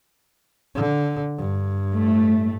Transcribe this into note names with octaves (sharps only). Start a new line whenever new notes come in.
D3
G2
A2 A3